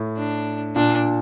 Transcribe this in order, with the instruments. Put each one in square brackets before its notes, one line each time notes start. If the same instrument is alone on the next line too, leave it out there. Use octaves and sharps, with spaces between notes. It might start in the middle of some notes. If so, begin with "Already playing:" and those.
Already playing: [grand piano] A2
[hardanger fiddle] D4
[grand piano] A#2 [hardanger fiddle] D4